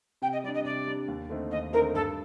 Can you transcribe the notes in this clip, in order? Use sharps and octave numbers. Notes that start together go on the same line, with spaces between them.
C3 G5
D#5
G3 D4 D5
D#5
C3 D5
G3 D4
D#2
D3 A3 C4 D#4
D#2 D#5
D3 A3 C4 D#4 A#4
G2 A4